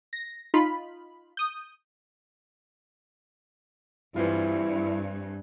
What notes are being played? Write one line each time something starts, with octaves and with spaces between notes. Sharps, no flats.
A#6
D#4 F4 B5
D#6 G6
G2 E3 C4 E4 F4